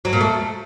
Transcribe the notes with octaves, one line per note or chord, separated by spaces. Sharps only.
F#3
A#2
A3